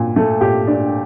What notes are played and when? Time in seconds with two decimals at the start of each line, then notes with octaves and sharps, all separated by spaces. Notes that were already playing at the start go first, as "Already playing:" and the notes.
Already playing: A#2
0.16 A3
0.41 A#2 G4
0.67 D4